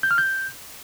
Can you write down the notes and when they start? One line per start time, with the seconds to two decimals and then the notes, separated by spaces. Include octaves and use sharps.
0.03 G6
0.11 F6
0.18 G6